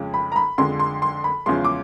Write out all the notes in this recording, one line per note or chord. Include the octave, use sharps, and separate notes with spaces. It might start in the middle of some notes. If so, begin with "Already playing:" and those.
Already playing: F2 C#3 F3 G#3
B5
A#5
B5
F2 D3 F3 G#3 C6
C6
C6
B5
E2 C#3 F3 G#3 C6
D6